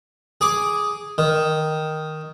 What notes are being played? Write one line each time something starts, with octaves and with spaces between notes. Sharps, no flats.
G#4 D6
D#3